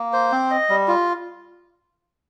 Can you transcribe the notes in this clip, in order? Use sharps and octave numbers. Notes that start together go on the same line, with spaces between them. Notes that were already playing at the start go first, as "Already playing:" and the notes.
Already playing: A#3
C5
C4
D#5
G3
F4